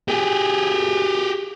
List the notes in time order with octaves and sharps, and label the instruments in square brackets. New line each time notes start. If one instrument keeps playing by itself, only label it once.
[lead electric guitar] G4 G#4